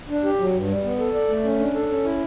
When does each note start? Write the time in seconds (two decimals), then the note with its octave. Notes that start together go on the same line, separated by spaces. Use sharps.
0.09 D4
0.24 G4
0.39 F#3
0.54 G2
0.68 G3
0.84 B3
0.99 A4
1.14 D5
1.29 A3
1.44 C#4
1.60 D4
1.74 A4
1.89 C#4
2.05 E4